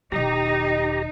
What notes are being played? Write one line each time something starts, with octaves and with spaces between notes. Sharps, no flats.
E1 D#3 D#4 G4 A#5